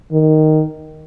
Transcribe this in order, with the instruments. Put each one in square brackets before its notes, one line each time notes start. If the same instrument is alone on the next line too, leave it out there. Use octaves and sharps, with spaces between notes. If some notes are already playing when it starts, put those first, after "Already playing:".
[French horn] D#3